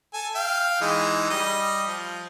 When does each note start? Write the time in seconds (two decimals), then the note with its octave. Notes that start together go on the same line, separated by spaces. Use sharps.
0.14 A4 G#5
0.35 F5 G5
0.81 E3 G#3 D#4
1.30 G3 D#5
1.86 F3